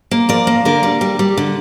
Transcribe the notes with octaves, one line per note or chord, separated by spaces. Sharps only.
A#3
F3 A#4 D5
A#3
D3 A#4 D5
G3
G3
G3
D3